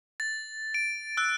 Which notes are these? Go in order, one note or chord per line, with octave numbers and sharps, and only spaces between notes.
A6
D7
E6 F#6